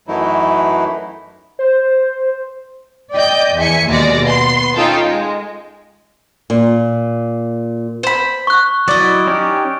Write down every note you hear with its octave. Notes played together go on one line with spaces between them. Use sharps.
F#2 E3 F#3 A3 D#4 E4
C5
D5 D#5 G5 G6
E2 E5 G#5 C#7
D#2 B2 G#3 D5 A#6
B3 C6
C#4 D#4 F4 A4 G5
G#3
A#2
C5 B5
C#6 F#6
F#3 E4 D5 D#5
C#4 D#4 G4